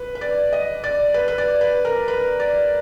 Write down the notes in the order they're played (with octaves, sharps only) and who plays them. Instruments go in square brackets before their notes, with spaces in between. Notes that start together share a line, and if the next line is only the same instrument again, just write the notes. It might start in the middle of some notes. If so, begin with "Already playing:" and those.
Already playing: [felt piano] B4
B4
D5
D#5
D5
B4
B4
D5
B4
A#4
B4
D5